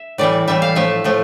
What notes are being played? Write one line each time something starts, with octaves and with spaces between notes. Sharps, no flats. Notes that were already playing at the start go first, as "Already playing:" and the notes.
Already playing: E5
A2 E3 G3 D5
A2 E3 G3 E5
F5
A2 F3 A3 E5
A2 F3 A3